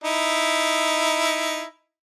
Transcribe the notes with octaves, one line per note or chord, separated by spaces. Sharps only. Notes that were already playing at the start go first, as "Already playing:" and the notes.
D#4 E4